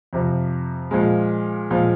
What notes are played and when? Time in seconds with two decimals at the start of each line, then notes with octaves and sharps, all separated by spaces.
0.13 F2 C3 F3
0.91 A#2 F3 G#3
1.70 A#2 F3 G#3